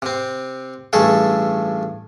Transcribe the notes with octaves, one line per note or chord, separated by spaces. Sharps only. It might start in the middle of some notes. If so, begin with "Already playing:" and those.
C3 C4
A1 G2 A3 G#4 A4